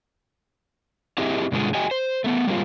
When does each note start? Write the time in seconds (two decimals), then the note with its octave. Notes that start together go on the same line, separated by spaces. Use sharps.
1.18 C4 E4 G4 G#4 D#5 E5
1.52 G2 B2 D3 G#3 F4 G#4
1.74 F#4 G4 D#5 G5 G#5
1.91 C5
2.24 A3 B3 A4
2.47 G3 G#3 A#3 C4 F4